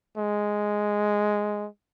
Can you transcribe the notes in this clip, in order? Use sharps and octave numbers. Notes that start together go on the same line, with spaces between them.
G#3